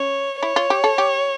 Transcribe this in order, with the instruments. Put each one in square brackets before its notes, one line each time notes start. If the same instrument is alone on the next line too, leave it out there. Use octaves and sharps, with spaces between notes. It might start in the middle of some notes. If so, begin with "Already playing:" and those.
Already playing: [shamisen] C#4 [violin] C#5
[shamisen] E4 [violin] C#5
[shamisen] F4
G4
A4
G4